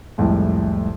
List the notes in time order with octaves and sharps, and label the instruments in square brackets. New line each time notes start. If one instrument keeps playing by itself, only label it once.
[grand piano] C2 F2 A2 G#3